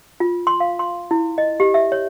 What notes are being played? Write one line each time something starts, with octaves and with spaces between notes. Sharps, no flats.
F4
C6
F5
C6
E4
D#5
G4
E5
C#5